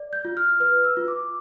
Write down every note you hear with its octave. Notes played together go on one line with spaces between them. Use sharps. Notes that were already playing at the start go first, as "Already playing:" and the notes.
Already playing: D5
G6
F4
F6
B4 F6
E6
F4
D6